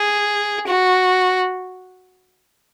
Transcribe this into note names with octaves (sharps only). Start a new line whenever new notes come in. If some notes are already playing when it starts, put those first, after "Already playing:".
Already playing: G#4
F#4